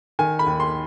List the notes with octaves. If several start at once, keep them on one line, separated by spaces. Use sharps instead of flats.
D#3 G#5
B5
D#2
C6